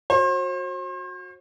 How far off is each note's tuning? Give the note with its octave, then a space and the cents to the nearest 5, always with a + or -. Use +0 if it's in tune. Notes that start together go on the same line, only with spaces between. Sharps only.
F#4 -20 C5 +40